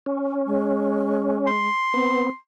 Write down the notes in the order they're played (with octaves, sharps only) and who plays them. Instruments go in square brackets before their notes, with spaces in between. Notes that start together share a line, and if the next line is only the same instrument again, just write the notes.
[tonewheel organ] C#4
[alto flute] G#3
[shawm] C6
[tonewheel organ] B3 [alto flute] C4